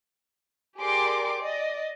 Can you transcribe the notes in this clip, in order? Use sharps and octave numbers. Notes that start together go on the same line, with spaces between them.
G4 G#4 A#4 D5 C6 D6
D5 D#5